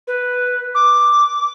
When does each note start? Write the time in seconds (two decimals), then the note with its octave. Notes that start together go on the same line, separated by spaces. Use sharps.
0.07 B4
0.75 D6